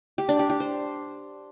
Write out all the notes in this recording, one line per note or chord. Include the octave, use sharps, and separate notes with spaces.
G4
D4
G4
G4
C5